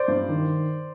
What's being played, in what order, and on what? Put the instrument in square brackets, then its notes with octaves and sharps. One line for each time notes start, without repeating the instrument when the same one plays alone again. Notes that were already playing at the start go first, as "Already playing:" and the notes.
Already playing: [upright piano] C5 D5
G2
D#3